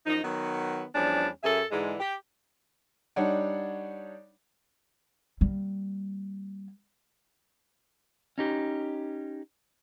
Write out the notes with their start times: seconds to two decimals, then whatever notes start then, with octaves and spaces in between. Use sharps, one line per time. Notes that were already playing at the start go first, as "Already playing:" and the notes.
0.06 F#2 F3 D#4
0.23 D#3 F#3 B3
0.95 E2 F3 G3 C#4 D4
1.43 F#2 G#4 A4 E5
1.71 G#2 D3 E3 G#3
2.00 G4
3.16 G3 D4 D#4 C#5 D5 F#5
5.41 G3 A#3
8.38 C#4 D#4 G4